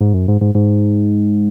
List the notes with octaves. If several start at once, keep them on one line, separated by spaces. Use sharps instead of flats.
G#2
F#2
G#2
G#2
G#2